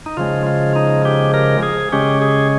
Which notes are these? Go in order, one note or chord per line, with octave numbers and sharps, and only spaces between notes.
D#4
C#3 F3 G#3 F4
F4
D#4
G4
A#4
G#4
C#3 G#3 C#4 G4
G#4